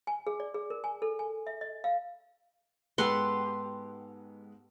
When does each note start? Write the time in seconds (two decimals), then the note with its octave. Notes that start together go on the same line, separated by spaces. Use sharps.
0.07 G#5
0.27 G#4
0.40 D5
0.54 G#4
0.70 A#4
0.84 G#5
1.02 A4
1.19 G#5
1.47 E5
1.61 D#5
1.84 F5
2.98 G#2 G#3 B3 G4 A4 B4 F#5 C6